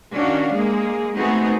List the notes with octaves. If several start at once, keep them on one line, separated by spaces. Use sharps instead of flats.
D#3 C#4 D4 F#4 F5
G#3 A#3 G#4
A3 B3 C4 D#4 F#4 G#4